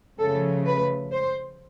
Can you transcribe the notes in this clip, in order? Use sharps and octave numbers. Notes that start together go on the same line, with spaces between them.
C#3 F3 A3 A4
B4
C5